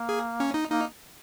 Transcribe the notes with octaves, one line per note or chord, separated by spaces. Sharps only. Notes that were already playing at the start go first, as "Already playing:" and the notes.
Already playing: A#3
G#4
C#4
D#4
A#3 D#4